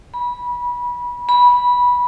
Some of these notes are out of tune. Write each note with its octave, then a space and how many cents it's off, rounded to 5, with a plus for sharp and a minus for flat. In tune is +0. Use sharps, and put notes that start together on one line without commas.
B5 -25
B5 -15